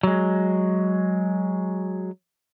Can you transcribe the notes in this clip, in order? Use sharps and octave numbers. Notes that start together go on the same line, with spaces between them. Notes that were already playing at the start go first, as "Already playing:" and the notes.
F#3 G#3